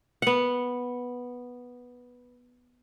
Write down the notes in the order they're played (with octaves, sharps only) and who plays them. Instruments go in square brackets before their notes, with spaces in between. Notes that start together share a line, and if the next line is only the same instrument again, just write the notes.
[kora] B3 F#5